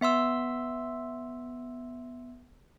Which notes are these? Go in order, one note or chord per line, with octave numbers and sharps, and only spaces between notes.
B3 E5 C6 E6